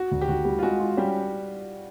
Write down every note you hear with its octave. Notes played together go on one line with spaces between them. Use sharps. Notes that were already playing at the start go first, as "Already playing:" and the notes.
Already playing: F#4
D2
G4
D2 F#4
G3
F4
G#3 F#4
F4
G3 C#4 G4